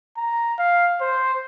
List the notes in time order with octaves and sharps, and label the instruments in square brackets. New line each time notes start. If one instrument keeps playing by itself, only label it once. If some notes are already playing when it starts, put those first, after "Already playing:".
[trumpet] A#5
F5
C5